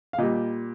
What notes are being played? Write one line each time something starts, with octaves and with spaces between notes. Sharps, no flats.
F5
A#2 G3 D#5